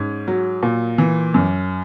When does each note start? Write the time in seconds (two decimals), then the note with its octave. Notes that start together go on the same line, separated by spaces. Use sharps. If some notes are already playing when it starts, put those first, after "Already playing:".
Already playing: G#2 C#4
0.28 F#3
0.63 A#2
0.98 E3
1.34 F#2